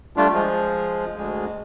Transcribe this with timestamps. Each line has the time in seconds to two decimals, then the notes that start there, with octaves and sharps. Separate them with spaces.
0.17 G3 A3 D4 F4
0.33 F3 G#3
1.16 D2 G#3